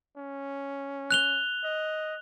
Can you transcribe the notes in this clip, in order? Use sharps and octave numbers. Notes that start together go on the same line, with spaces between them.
C#4
F#6 F7 G7
D#5